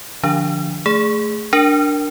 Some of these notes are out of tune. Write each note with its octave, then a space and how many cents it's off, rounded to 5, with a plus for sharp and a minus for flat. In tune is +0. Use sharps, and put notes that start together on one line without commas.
D3 +15 F3 +0 D4 -15
A3 +0 G#4 +0
D4 +0 A#4 +0